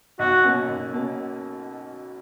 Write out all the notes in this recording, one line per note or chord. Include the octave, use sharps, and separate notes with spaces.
B1 F#4
B2 A#3 C#4
B1
B2 A#3 C#4